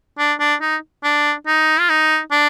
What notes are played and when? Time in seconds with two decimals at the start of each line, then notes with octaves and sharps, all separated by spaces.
0.18 D4
0.40 D4
0.61 D#4
1.04 D4
1.47 D#4
1.79 F4
1.89 D#4
2.32 D4